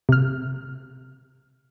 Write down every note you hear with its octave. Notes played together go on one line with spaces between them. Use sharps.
C3 F6